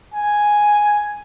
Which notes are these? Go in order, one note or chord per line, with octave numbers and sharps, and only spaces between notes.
G#5